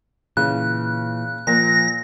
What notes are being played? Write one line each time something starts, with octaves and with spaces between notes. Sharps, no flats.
A#2 C#3 E3 F#6
A#2 F3 A#6